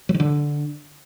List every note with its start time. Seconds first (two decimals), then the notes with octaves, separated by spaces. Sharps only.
0.09 F#3
0.14 D#3
0.20 D3